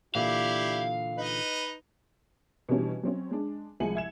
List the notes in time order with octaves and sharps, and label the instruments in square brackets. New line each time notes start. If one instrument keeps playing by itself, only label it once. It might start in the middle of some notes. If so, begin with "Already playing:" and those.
[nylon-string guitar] A#2 D3 E3 [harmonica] E4 G4 D5 [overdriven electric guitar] F5
[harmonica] D#4 B4 D#5
[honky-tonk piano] B2 E3 G3 C#4 D4
F#3 C4 C#4
G#3 D4
C2 F3 G#3 G#5 C#7 F#7
E5 G#6 E7